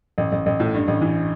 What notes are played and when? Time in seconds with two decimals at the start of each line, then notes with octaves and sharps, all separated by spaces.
0.18 A1
0.32 A1
0.46 A1
0.60 A2
0.74 G2
0.88 A1
1.01 E3